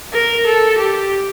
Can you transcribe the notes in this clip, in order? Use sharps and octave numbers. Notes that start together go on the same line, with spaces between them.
A#4
A4
G4